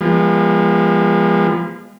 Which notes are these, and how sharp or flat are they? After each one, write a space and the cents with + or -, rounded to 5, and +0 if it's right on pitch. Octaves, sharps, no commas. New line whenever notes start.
F3 -25 G#3 -40 B3 -45